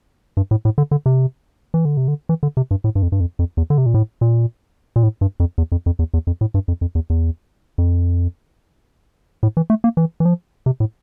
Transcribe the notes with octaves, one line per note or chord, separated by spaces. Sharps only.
G2
A2
A2
D3
D3
C3
E3
D3
C3
D3
E3
D3
C3
G2
A2
G2
F2
G2
F2
F2
E2
D3
C3
A#2
A2
A#2
A#2
A2
G2
F2
E2
F2
F2
E2
E2
F2
A2
G2
F2
F2
E2
E2
F2
A2
E3
A3
A#3
E3
E3
F3
C3
A2